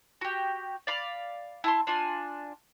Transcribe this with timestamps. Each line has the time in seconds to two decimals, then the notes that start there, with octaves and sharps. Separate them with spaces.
0.21 F#4 G4
0.87 D5 F5 B5
1.64 E4 A5 C6
1.87 D4 F4 G#5